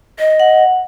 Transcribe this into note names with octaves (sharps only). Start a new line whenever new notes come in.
D#5
F#5